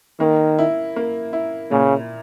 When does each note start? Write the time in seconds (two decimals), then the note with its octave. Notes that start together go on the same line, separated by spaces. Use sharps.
0.20 D#3 A#3
0.59 E4
0.96 A#3
1.33 E4
1.71 A#2 C#3